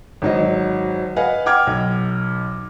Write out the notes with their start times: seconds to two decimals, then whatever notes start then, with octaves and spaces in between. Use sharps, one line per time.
0.22 G#1 F#3 D#5
1.16 B4 D#5 F5 F#5 G#5
1.46 F#5 G5 D6 F6 G#6
1.67 B1